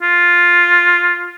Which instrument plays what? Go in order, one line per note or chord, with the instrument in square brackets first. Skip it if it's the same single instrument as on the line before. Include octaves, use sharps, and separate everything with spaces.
[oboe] F4